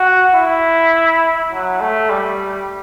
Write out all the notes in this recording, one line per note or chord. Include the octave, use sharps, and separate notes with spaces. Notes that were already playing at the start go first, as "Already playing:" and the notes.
Already playing: F#4
E4
F#3
A3
G3